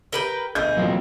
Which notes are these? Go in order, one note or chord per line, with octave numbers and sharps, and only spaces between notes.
G4 A#4 B4 G5 F#7 G7
D2 B2 G#4 G6
A2 E3 F#3 A#3 C4 F4